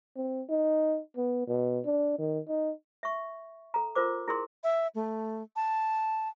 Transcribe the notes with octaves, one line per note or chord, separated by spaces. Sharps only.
C4
D#4
B3
B2
D4
D#3
D#4
E5 C#6
A4 A#5
F4 A#4 C5 D6
E4 G#4 A#4 C6
E5
A3
A5